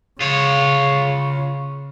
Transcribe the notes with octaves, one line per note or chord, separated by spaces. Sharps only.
C#3 F4 C#5